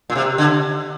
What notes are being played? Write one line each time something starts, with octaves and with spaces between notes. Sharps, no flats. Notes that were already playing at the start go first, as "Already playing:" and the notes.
A#2
C3
D3